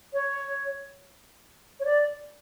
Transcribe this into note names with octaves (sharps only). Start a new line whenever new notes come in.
C#5
C#5
D5